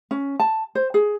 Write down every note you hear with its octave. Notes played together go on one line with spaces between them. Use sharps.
C#4
A5
C5
G#4